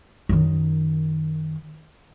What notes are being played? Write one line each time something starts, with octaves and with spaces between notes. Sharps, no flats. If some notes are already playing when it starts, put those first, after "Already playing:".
F#2 D#3